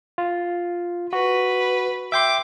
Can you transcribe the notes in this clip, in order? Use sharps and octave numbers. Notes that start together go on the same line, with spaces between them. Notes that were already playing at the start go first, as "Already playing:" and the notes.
F4
F#4 B4
E5 G5 C6 D6